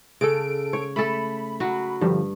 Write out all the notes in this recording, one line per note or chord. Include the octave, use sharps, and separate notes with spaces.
C#3 A4 D7
C#5
A3 A4 B5
F#3 F#4
G2 D3 F3 G3